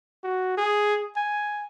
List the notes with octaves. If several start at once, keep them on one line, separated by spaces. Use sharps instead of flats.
F#4
G#4
G#5